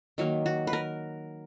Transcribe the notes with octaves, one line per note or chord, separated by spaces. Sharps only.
D#3 F#3 A#3
F#4
B4
A#4